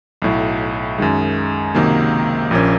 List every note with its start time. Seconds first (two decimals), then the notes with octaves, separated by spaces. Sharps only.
0.22 B1 A2 F#3
0.98 F#2 D#3 G#3
1.75 C#2 C3 D#3 F#3 A#3
2.51 A#1 A#2 F3 A#3 C#4